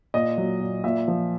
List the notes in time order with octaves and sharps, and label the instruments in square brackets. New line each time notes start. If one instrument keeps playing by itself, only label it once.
[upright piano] A#2 D#5
F#3
A#2
A#2 E5
F3